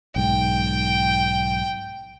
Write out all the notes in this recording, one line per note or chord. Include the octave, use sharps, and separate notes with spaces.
B1 G#2 G5